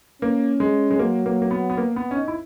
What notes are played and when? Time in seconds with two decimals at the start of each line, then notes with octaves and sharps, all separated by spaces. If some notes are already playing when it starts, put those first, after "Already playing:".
0.22 A#3 C#4
0.60 G#3
0.91 G#3
0.99 F#3 A#3
1.26 A#3
1.42 A#3
1.51 B3
1.70 B3
1.77 A#3
1.96 B3
2.11 C#4
2.16 D#4
2.28 E4